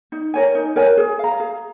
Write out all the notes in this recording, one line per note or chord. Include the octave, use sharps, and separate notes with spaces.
D#4
A#4 C#5 G#5
D#4
A#4 C#5 G#5
G#4
F5 A#5
G#4